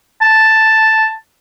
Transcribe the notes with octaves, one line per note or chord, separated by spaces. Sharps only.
A5